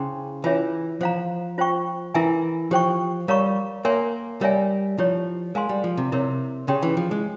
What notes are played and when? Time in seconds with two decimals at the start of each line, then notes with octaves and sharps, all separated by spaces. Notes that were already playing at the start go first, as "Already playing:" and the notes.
Already playing: C#3 E4 G#4 C5 G5 C6
0.44 E3 F4 G#4 C#5 E5
1.01 F3 C5 F5 A#5
1.58 F4 C5 G5 C#6
2.14 E3 E4 A#4 E5 G#5
2.71 F3 G4 C5 G5 C#6
3.28 G3 A#4 C#5 F5 A#5 C#6
3.85 A#3 A#4 C#5 E5 G#5 C6
4.41 G3 A#4 C#5 E5 G#5
4.98 F3 E4 G4 C#5
5.55 G#3 A#4 F5 G#5 C6
5.69 G3
5.84 F3
5.97 C3
6.12 C3 E4 A#4 C#5
6.68 C#3 G4 C#5 G5 C6
6.82 E3
6.97 F3
7.11 G#3